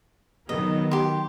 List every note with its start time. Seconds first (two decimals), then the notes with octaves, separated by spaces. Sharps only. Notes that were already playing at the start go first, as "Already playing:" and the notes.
0.49 D#3 F#3 B3 D#5
0.91 G4 C6